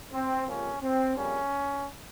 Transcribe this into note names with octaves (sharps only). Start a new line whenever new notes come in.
C4
C#2 C3 F3 A#3 C#4
C4
F2 C#3 G3 A#3 C#4